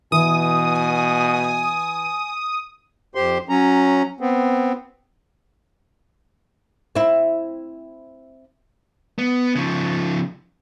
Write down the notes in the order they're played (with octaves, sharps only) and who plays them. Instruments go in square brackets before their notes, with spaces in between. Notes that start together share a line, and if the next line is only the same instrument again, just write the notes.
[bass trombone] B2 [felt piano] E3 [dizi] G#5 [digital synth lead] D#6
[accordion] F2 G4 C5 C6
F#3 C#4 A#5
B3 C4
[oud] C4 E4
[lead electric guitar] B3
C#3 F3